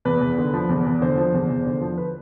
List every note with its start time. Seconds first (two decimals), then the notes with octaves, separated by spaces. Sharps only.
0.05 E2 B4
0.21 E2
0.38 D3
0.54 F3
0.69 E2
0.86 E2
1.02 D3 C5
1.17 F3
1.34 E2
1.50 E2
1.66 D3
1.81 F3
1.98 B4